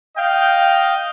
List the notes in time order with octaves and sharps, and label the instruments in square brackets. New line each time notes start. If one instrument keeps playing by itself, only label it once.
[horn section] D#5 F5 G5